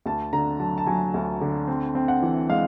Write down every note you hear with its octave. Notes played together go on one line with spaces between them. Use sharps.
D2 A5
D3 A#5
F#3 A5
A5
F#3 G#5
D2
D3
C4
C4
F#5
E3
G#3 F5